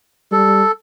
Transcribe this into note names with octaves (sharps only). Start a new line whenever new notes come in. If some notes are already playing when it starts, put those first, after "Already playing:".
G3 A4